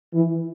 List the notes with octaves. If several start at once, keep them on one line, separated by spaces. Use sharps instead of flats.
E3